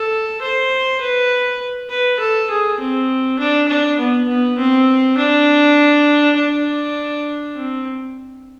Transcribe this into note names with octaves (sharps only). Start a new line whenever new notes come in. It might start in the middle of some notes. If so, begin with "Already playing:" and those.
Already playing: A4
C5
B4
B4
A4
G#4
C4
D4
D4
B3
B3
C4
D4
D4
C4